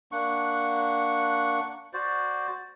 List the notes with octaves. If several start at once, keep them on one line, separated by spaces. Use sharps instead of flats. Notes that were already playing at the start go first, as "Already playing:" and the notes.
A#3 D4 F#5 C#6
F#4 C5 D5